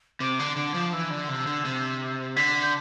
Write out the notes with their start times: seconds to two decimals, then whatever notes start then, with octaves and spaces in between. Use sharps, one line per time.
0.20 C3 D6
0.39 D3
0.56 D3 D6
0.74 F3
0.92 E3 E6
1.10 D3
1.29 C3
1.47 D3
1.65 C3
2.36 D3 B6
2.62 G6